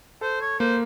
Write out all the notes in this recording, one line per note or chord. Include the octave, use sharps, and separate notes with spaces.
A4 C5
C#5
A#3 C5